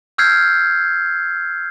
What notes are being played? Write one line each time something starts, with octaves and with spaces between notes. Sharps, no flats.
E6 F6 G6 G#6 C7